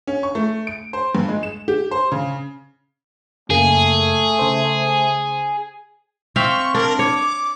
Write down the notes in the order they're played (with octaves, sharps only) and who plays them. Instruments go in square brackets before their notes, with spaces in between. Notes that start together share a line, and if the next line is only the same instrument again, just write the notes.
[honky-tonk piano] C#4
C#6
A3
D7
C5
G2
G#3
E7
G4
C5
C#3
[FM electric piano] F#2 C#3 A#3 [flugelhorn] A3 [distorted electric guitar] G#4
[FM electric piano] C#3 C5
[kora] C4 E5 F5 [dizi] C#6
[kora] D4 [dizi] A#4
[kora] C#5 [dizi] D6